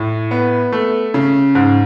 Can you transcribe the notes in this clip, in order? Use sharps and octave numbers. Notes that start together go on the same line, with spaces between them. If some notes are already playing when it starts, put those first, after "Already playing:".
Already playing: A2
B3
A3
C#3
G#2